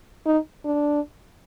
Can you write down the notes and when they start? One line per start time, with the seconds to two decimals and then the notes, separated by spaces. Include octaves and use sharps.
0.26 D#4
0.65 D4